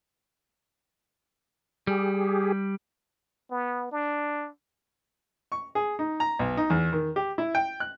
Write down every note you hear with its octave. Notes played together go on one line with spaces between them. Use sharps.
G3 G4 G#4
B3
D4
C#6
G#4
D#4
A#5
B1
D#4
E2
D#3
G4
E4
G5
F#6